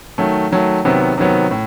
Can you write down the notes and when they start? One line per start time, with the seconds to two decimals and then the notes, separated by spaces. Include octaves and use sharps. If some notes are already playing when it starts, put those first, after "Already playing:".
0.18 D#3 F#3 A3
0.51 D#3 F#3 A3
0.85 C3 D#3 F#3 B3
1.18 C3 D#3 F#3 B3
1.51 A2